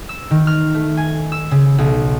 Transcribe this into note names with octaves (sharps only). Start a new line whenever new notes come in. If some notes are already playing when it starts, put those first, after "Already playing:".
E6
D#3
F6
A3
G#5
E6
C#3
B1